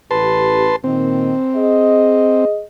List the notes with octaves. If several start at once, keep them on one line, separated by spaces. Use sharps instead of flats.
A1 G4 B4 A5 C6
A#2 D#3 C4
G#4 D#5